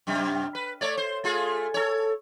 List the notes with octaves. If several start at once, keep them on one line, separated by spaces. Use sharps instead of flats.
F#2 C3 G3
B4
A3 C#5 D5
C5
A3 F4 G#4
A4 C#5